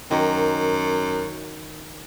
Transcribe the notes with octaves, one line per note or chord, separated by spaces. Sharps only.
F#2 D#3